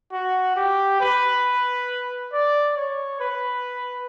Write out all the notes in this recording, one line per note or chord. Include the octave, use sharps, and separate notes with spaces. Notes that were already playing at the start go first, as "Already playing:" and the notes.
F#4
G4
B4
D5
C#5
B4